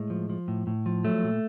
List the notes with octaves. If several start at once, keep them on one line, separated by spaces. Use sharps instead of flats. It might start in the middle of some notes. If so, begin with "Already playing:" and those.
Already playing: A2 G#3
F3
F3
A2
A2
F3
F#3 A3
A#2